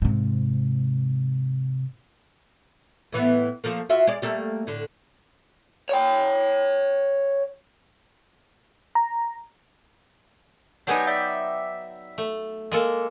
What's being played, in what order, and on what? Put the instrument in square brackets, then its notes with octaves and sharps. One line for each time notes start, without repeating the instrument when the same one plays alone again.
[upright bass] G#2 C3
[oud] A2 E3 B3
F3 A3 A#3
F4 F#4 E5
G#3 D5
G3 A3 A#3
A2 D3
[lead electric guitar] C#5 G5
[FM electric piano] A#5
[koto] F#3 B3 D#4 [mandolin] D4 G4 G#5
[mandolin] D5 E5 G5
[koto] A3
[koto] G#3 A#3 A4 [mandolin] F6